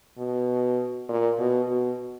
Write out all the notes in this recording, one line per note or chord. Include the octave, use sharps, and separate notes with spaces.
B2
A#2
B2
B2